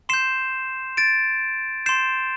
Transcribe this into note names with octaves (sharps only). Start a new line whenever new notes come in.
C6 G6 C7 E7
A6 D7
C6 G6 C7 E7